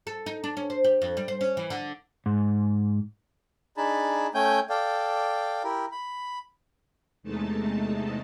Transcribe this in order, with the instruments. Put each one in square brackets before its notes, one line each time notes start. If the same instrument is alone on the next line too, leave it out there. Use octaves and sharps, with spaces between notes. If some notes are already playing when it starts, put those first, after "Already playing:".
[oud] A4
D#4
D4
C#4
C5
G4
F2
G3
C5
C#4
E3
D3
[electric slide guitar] G#2
[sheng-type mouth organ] D4 D#4 G#4 A5 B5
A3 C#4 G5 G#5 G6
A4 D5 F5 G5
E4 G4 A#4
B5
[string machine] E2 C3 G#3 A3 D#4 A5